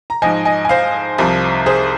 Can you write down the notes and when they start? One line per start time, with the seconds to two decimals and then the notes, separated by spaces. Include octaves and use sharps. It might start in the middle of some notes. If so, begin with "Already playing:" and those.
0.10 A#5
0.22 G#2 F3 D#5 G#5
0.45 D#5 G#5
0.65 G#5
0.69 C5 F5
1.18 C2 C3 F3
1.66 G#4 C5